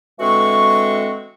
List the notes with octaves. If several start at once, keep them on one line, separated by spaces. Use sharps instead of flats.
D3 E3 G#3 C4 F#4 C#6